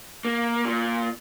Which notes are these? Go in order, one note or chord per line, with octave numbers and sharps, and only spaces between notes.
A#3
A#2